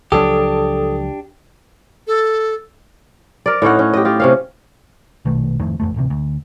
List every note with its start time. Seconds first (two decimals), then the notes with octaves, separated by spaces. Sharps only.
0.12 C#2 F3 F#3 D4 G4 A4 D#6
2.07 A4
3.46 A#4 D5
3.62 A2 C#4 D#4 F#5
3.79 C#4
3.93 G4 D#5
4.05 F4 G4
4.20 C3 C#4 F5
5.25 A#1 B2 D#3 A3
5.60 G#1 F2 A2 D#3
5.80 A1 F2 A3
5.94 D1 A1 C3
6.10 D2